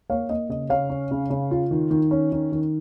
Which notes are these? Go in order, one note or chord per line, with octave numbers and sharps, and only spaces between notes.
A#3 C#5 F5
A#3 D#5
C#3 D#5
C#3 C#5 F5
C#4
C#3
C#3
F4
D#3
D#3
C#4
D#3
D#3